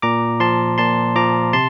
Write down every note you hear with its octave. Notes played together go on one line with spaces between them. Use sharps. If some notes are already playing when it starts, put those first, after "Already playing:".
A#2 A#5 D6
F3 A5 C6
A#2 A5 C6
F3 A#5 D6
C3 A5 C6